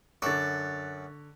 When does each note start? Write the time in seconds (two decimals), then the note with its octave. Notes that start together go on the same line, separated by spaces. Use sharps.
0.22 F#2 D3 A4 D5 C#6 F#6 A6